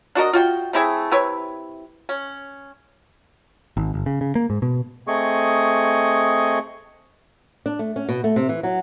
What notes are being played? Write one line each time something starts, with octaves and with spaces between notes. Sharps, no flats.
D4 F#4 A#4 D#5
F4 F#4 G5
A3 C4 E4 G#4
C3 E4 B4 C#5
C#4
G#1
G1
C#3
C#3
A#3
G#2
B2
A3 C4 G#4 D#5 C#6
D4
A3
C#4
B2
A3
C3
E3
F#3